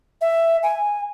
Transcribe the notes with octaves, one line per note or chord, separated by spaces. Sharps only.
E5
G#5